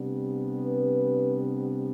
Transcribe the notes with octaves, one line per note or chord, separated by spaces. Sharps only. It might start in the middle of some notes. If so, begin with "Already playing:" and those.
Already playing: C3 G3 B3 D4
B4